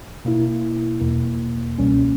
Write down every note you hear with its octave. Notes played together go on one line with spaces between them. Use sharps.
B2 A#3 E4
E2 B2 A#3
C#2 B2 G3 A#3 C#4